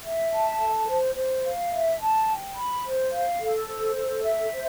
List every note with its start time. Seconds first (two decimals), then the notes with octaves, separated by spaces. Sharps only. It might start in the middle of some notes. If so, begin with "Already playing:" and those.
0.03 E5
0.31 A5
0.60 A4
0.87 C5
1.15 C5
1.43 F5
1.71 E5
1.99 A5
2.27 G5
2.56 B5
2.83 C5
3.11 F5
3.39 A4
3.67 C5
3.95 A4
4.22 E5
4.51 C5